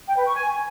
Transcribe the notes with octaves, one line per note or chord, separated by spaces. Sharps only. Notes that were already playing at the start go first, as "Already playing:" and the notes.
G5
B4
C#6
G#5